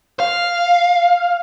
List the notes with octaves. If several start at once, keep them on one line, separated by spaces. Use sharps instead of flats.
F5